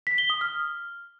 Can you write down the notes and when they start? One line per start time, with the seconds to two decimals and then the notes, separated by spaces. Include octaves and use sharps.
0.07 B6
0.18 G7
0.30 D#6
0.41 F6